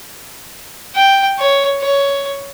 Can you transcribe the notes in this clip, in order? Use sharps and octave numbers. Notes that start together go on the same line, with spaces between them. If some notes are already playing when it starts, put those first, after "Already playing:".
G5
C#5
C#5